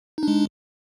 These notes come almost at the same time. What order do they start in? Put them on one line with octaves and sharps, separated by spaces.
D#4 D4 G#3